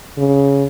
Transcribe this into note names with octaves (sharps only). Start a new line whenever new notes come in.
C#3